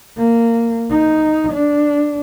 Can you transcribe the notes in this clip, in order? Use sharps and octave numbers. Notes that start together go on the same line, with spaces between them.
A#3
D#4
D4